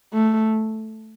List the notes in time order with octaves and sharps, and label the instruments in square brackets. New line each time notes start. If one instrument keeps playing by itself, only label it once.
[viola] A3